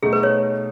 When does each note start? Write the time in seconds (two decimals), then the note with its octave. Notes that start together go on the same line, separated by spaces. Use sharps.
0.03 B2 A3 D#4 G#4
0.13 B4
0.23 C#5